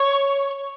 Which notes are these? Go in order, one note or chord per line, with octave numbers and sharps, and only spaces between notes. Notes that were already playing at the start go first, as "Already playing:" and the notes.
Already playing: C#5